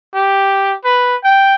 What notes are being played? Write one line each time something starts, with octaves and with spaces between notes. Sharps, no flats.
G4
B4
G5